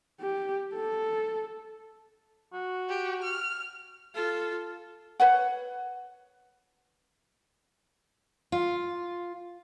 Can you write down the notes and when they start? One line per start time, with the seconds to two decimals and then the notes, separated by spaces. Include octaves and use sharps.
0.20 G4
0.75 A4
2.53 F#4
2.88 G4
3.22 F6
4.14 F4 A4
5.20 B4 C#5 F#5
8.52 F4